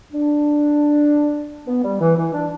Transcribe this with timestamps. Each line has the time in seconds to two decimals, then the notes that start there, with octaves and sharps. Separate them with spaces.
0.12 D4
1.66 B3
1.83 G3
2.01 E3
2.17 E3
2.33 D4